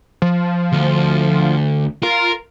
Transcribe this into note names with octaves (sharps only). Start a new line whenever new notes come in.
F3
D2
F4 A#4